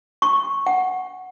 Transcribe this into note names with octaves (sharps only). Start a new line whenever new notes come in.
C#6
F#5